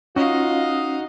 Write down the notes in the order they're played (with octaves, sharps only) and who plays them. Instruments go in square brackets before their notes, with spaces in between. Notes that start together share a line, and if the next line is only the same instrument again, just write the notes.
[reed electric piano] C#4 [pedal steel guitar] D#4 F#4 [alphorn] F4 [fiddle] D#5 F5